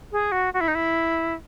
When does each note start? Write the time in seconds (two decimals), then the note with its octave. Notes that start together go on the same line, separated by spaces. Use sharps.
0.12 G#4
0.32 F#4
0.54 F#4
0.61 E4
0.68 D#4
0.75 E4